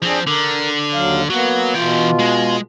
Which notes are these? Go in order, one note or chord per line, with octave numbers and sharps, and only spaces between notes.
F3 C4 D4 G#4
D3 A#4
D#2 F#3 F5
F#3 A#3 B3
B2 E3 F4 G5
G#3